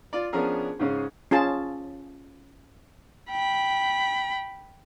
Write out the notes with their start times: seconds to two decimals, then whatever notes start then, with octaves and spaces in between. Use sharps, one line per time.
0.13 F4 D5
0.33 F3 B3 C#4 D4 G#4 A#4
0.79 G#2 C#3 C#4 G#4
1.31 C#4 F4 G#4 A5
3.31 G5 B5